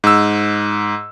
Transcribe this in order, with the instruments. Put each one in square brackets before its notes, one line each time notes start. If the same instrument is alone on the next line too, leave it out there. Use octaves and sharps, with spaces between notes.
[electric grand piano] G#2 E6